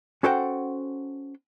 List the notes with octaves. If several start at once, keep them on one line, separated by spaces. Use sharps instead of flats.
C#4 F#4 A4 C5 F#5 G5